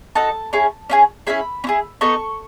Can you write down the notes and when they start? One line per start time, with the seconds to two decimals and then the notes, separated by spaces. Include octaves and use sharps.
0.15 D#4 F#4 A4 A5
0.53 C#4 E4 G#4
0.90 C#4 E4 G#4
1.27 C#4 E4 G#4 B5
1.64 C#4
1.67 E4 G#4
2.01 B3 D#4 A4 C#6